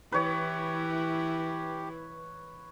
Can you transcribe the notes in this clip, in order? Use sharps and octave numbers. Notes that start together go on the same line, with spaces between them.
E3 E4 G4 B4 C#5